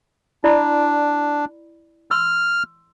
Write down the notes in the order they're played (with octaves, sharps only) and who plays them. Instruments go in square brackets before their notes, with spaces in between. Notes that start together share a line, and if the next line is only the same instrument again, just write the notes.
[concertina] D4 [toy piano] E4 D5 B5
[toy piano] C6 E6 [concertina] F6